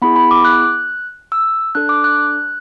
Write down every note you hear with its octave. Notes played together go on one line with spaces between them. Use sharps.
B3 E4 G#4 B5
B5
D6
F#6
E6
D4 A4 F#6
D6
F#6